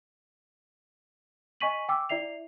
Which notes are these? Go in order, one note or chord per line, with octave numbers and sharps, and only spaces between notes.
D#5 G#5 C#6 B6 D#7 F#7
G5 D6 E6
E4 D5 E5 C7 F7